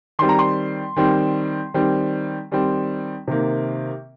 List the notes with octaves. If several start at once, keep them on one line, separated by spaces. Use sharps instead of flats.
D#3 G3 C4 C6
A#5
C6
D#3 G3 C4
D#3 G3 C4
D#3 G3 C4
C3 D#3 A#3